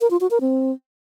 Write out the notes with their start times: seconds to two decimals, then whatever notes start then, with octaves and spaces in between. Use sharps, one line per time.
0.01 A#4
0.11 F4
0.21 F#4
0.31 A#4
0.41 C4